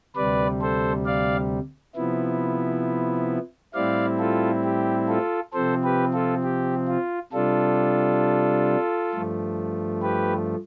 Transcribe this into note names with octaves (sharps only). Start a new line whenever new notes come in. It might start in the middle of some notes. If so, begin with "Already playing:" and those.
D2 C3 G3 B4 D5
A4 C5
D5 F5
C3 F3 B3 E4
A2 G3 C4 E4 D5 F5
F4 A4
G4
F4 A4
C3 F3 C4 A4 C5
G4 B4
F4 A4
G4
F4
C3 G3 D4 F4 A4
G2 F3 A3
G4 B4